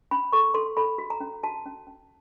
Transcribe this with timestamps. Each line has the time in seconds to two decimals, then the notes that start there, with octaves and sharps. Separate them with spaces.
0.11 C#4 B5
0.33 A4 C#6
0.54 A4 C6
0.77 A4 B5
0.98 F#4
1.10 A#5
1.20 C#4
1.43 F#4 A5
1.66 C#4
1.87 C#4